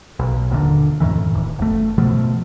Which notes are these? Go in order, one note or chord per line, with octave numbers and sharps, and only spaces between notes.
B1
D#1 A#2 D3
F2 A2 D#3 E3
D1
F#1 A3
B2 F3 A3